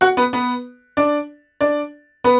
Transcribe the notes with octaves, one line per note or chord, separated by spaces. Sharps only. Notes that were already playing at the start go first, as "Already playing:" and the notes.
F#4 F#5
B3 B4
B3 B4
D4 D5
D4 D5
B3 B4